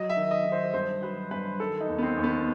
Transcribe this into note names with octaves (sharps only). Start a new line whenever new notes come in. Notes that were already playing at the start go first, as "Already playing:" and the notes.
Already playing: F#3 D#5
E5
D#3
D#5
D#3
C5
G2 C5
F#3 B4
G2 B4
D#3 A4
D#4
D#2
B3
C4
D#2
B3